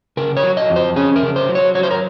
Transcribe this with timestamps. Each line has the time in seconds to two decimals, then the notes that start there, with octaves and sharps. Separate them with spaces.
0.17 C#3 A#4
0.37 C#5
0.43 F#3
0.57 D#5
0.70 F2
0.76 C5
0.96 C#4 G#4
1.16 A#4
1.22 C#3
1.36 C5
1.49 F#3
1.55 C#5
1.75 F#3 C#5
1.83 C5
1.91 A#4